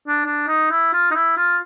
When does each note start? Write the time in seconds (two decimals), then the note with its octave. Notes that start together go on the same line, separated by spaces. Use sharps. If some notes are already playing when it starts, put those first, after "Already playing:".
0.08 D4
0.26 D4
0.48 D#4
0.71 E4
0.93 F4
1.11 D#4
1.15 E4
1.37 F4